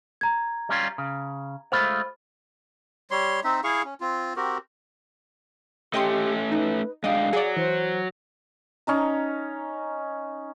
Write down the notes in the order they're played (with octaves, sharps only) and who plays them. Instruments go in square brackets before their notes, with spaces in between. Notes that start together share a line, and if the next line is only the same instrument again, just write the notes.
[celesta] A#5 G#6
[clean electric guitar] G3 C#4 F4
C#3
[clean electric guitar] G#3 A3 F4 [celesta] C5 B5 F6
[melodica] G3 C#5 C6
C4 D#4 E5
E4 G#4 F5 C#6
C#4
C4 F4
C4 F#4 G4 A#4
[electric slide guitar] A3 C#4 [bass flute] G4 [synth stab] D#5 G5 C6
[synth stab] D#4 [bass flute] B4
[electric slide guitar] G#3 D4 G5 [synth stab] D#5 [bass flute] F5
[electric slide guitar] F#3 [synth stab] G#4 D5
[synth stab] E3 [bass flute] C5
[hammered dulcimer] C#4 D#4 A#5